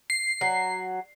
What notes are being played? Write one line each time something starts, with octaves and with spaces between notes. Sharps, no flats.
C7
F#3